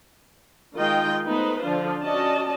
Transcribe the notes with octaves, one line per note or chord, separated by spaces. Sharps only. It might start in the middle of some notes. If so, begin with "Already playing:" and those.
D#3 G#3 F4 D#5 G5
A3 B3 D#4 B4 C5
D3 F3 D4 F4
C#4 F#4 D5 D#5 A5